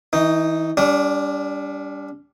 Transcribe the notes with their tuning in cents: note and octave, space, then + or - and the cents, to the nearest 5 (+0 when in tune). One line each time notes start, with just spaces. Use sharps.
E3 -30 D#4 +0
G3 +10 D4 -40